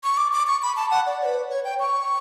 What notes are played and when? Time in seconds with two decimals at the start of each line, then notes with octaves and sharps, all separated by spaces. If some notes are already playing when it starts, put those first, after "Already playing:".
0.04 C#6
0.17 D6
0.33 D6
0.47 C#6
0.63 B5
0.76 A5
0.91 F#5
1.07 D5
1.21 C#5
1.25 B4
1.50 C#5
1.64 G5
1.79 C#6